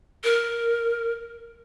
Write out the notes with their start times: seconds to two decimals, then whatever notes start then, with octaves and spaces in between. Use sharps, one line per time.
0.24 A#4